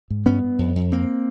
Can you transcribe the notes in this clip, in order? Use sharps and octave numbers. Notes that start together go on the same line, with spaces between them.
G#2
G2 B3 C#4
G2
F2
F2
F2 A#3 C4